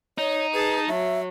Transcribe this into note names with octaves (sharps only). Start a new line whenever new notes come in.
D#4 C#5
G#4 B4 A5
F#3 E5